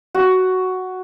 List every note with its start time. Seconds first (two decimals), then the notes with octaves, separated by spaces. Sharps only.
0.15 F#4